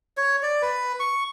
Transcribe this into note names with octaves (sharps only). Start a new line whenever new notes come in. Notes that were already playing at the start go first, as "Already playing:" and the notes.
C#5
D5
B4
C#6